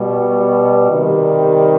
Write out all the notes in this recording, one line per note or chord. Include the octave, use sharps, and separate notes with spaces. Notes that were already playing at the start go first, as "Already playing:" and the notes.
Already playing: B2 G3
C3 D#3 G3